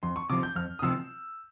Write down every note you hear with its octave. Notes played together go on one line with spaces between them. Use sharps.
F2 C6
C#6
C3 F3 D6
G6
F2 F6
D#6
C3 F3 E6